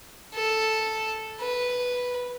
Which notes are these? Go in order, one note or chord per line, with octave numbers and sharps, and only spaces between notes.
A4
B4